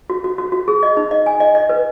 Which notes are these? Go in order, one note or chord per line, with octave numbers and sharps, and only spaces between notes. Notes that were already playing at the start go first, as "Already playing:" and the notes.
F#4
F#4
F#4
F#4
G#4
D#5
D#4
D#5
G#5
D#5
D#5
B4